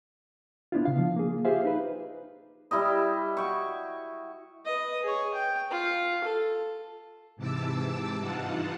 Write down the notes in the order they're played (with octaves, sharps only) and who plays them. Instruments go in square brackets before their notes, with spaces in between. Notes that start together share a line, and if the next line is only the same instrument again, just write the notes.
[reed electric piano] B3 D4 E4 F4
C#3 F5
F3
A#3 G#4
F4 G4 G#4 C5 E5 F5
D#4 B4
[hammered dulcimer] G3 E4 G4 D#5
F#4 G5 C#6
[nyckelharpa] B4 D#5
G#4 C#5
G5
F4
A4
[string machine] G#2 C3 E3 A5 D6 E6
G2 E3 D#4 F4 F#5 A5